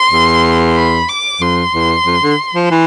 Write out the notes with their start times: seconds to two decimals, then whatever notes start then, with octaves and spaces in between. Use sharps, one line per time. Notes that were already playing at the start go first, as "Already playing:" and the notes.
Already playing: C6
0.11 E2
0.76 B5
1.09 D6
1.41 F2 C6
1.73 E2
2.06 F2
2.23 D3
2.55 F3
2.71 E3